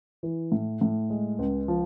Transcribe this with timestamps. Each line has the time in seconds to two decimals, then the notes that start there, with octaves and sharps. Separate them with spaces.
0.23 E3
0.52 A2
0.81 A2
1.10 G#3
1.39 C#2
1.68 F3